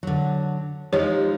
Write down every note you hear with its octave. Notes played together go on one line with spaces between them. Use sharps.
D3 F#3
F3 G#3 D#4 G4 C#5